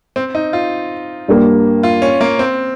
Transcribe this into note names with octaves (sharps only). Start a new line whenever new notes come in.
C4
D#4
F4
G2 G3 A#3
F4
C#4
A#3
C4